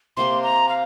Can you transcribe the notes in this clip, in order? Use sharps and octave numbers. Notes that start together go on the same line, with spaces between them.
C3 A#3 G4 C6
A#5
F5